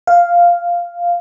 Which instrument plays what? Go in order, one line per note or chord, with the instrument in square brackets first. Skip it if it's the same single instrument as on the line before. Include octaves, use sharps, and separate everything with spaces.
[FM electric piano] F5